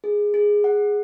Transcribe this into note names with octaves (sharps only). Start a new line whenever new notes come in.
G#4
G#4
F#5